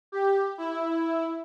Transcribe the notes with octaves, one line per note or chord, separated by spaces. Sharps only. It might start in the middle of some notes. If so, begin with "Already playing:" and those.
G4
E4